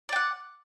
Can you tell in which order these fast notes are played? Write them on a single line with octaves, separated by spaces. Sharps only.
D5 G5 F#5